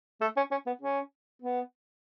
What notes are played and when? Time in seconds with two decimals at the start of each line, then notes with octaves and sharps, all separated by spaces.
0.21 A3
0.37 C#4
0.51 C#4
0.67 B3
0.82 C#4
1.42 B3